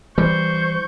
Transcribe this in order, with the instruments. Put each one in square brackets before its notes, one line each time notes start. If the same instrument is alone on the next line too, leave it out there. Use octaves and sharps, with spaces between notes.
[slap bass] E3 G3 [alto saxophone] C5 [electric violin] C#6 G6